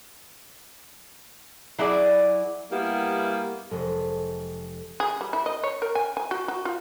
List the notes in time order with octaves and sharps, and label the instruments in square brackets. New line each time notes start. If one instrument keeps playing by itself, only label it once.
[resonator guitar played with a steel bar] F#3 E4 G#4 D5
[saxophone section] G3 A#3 B3 E4
[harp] F1 G#3 A4
[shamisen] G#4
G3
E4
D#5
C#5
A#4
G#5
G#5
F#4
F#4
F4